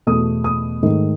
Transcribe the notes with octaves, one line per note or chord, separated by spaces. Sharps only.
E2 B2 A3 D#6
D#6
G#2 D#3 A3